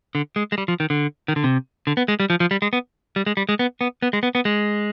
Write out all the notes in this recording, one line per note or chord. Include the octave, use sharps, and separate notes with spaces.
D3
G#3
G#3
G3
F3
D#3
D3
D#3
D3
C3
D3
B3
G#3
G3
F3
F3
G3
G#3
B3
G3
G#3
G3
G#3
B3
B3
B3
G#3
B3
B3
G#3